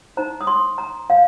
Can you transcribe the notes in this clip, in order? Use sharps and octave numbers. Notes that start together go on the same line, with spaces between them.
D#4 C5 A#5
D#6
C6
A#5
F5